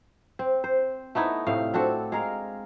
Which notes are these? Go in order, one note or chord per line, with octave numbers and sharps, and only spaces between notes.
C4
C5
A3 B3 D#4 E4
A2 C3 F5
C4 D4 F#4 A4
G#3 A#4 F5